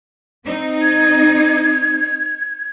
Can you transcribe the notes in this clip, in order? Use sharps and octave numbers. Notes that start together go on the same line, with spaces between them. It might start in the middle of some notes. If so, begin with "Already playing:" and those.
C4 D#4
G#6